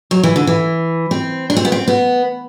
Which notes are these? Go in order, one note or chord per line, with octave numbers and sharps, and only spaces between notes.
F#3
E3
D3
E3
C4
D4
C4
B3
C4
B3